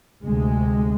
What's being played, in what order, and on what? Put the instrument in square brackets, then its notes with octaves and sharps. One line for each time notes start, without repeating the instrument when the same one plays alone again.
[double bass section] D2 C3 G#3